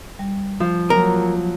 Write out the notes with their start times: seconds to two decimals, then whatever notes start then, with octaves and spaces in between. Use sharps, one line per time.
0.19 G3
0.60 F3
0.90 F#3 A#3 F4 A#4